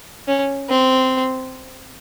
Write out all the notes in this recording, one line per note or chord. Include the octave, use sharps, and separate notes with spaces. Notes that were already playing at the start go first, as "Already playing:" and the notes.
C#4
C4